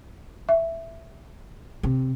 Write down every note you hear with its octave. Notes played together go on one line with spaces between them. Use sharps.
E5
C3